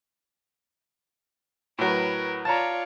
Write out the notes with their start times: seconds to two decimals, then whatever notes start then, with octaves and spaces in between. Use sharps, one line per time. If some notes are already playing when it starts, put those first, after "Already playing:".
1.79 A2 F#3 A#4 B4
2.45 F4 C#5 D5 A5 A#5